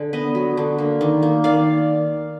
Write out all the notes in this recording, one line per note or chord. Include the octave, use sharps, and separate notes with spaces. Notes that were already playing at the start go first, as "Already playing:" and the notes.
Already playing: D3 G#4
B3 B4 D#5
F#3
D3
A#3
D#3
A#3
D#3 D5 F5